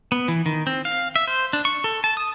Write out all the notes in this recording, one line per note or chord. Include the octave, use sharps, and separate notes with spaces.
B3
E3
D#3
C4
F5
E5
C5
D4
C#6
A4
A5
D#6